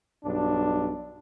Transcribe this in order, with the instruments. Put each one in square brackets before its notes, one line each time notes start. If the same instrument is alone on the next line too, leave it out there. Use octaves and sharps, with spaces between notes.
[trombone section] B1 G2 D4